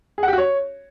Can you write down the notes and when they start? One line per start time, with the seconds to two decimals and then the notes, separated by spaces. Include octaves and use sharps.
0.18 G#4
0.23 F#5
0.28 G4
0.33 F#4
0.38 C#5